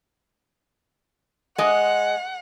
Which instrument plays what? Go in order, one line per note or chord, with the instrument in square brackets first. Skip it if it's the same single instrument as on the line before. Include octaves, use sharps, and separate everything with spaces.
[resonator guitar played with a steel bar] G#3 D#5 [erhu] F#5